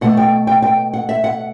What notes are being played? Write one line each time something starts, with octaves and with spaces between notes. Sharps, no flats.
B2 A3 F#5
G5
G5
G5
F#5
E5
F#5